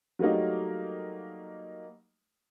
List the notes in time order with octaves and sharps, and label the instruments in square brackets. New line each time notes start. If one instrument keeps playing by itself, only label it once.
[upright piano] F#3 G3 A3 A#3 D#4